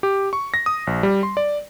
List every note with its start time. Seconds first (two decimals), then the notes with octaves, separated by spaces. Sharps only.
0.03 G4
0.33 C#6
0.54 A#6
0.66 D#6
0.87 A#1
1.03 G3
1.23 C6
1.37 D5